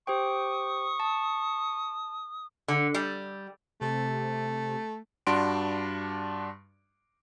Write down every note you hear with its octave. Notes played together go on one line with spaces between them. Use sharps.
G4 C5 G5 C#6 D#6
A5
D3
G3
C3 A3
G2 D4 F#4 C6 D7